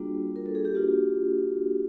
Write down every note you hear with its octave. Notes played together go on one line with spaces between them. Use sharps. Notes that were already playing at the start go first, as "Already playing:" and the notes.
Already playing: G3 A#3 D4 F4 F#4 G#4
A#4
A4
G#4
G4
A#3 D4 F4 F#4